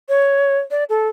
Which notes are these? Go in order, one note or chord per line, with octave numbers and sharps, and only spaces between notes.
C#5
D5
A4